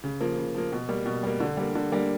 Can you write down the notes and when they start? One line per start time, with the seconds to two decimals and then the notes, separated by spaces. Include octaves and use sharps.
0.04 C#3
0.20 F3 A#3
0.37 C#3
0.55 F3 A#3
0.72 B2
0.89 G3 A#3
1.06 B2
1.23 G3 A#3
1.40 D3
1.57 G3 A#3
1.75 D3
1.92 G3 A#3